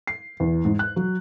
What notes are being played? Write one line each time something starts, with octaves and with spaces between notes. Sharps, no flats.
C7
E2
G#2
F#6
F#3